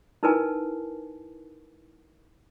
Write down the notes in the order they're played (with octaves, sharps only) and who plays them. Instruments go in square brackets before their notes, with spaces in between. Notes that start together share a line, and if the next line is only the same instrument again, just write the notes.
[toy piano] D#4 E4 A#4 B4 G#5 A5